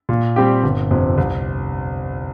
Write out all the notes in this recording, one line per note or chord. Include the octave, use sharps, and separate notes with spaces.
A#2
G3 C4 G4
G1
F2 C3
C2